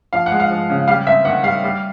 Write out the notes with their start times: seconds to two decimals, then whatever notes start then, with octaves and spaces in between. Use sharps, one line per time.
0.13 F3 F5
0.26 F#5
0.32 G#3
0.40 F5
0.50 F3
0.70 C#3
0.88 G3 F5
1.07 C4 E5
1.25 D#3 F#5
1.44 G3 F5
1.64 G3